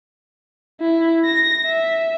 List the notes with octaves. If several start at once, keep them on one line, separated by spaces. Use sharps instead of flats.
E4
A#6
E5